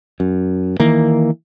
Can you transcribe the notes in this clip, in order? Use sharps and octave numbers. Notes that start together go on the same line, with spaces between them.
F#2
D#3 E3 A#3